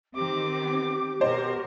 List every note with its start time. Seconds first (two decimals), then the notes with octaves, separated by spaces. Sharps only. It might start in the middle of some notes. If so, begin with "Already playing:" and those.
0.15 D#3 C4 G4 D6
1.21 B2 A#4 C5